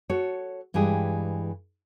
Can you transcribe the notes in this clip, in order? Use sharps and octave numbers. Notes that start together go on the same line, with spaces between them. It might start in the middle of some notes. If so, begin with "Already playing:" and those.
F#4 A4 C#5
G2 E3 G#3 G4 G#4